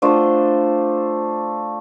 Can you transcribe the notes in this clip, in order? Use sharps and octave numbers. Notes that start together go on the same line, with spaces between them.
A3 D4 F4 C5